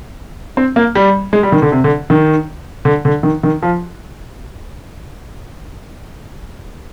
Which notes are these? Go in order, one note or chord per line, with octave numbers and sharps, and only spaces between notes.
C4
A#3
G3
G#3
G3
D#3
D3
C3
D3
D#3
D3
D3
D#3
D#3
F3